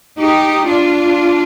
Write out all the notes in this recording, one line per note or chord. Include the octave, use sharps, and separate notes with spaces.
D#4 G4
D4 F4